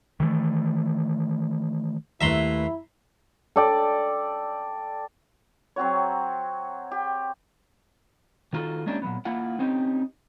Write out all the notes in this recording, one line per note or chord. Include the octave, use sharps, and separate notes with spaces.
D#3 E3 G#3 A3
D#2 A3 E4 B4 E5 A#5 C6
A4 D5 G5
F#3 C4 F#4 C#5
G4
D#3 D#4 F4 F#4 A4
G#3 A#3 C#4 D4 E4 G4
A#2 F#3 B3
A#3 E4 F4 F#5
C4 C#4 D#4 G4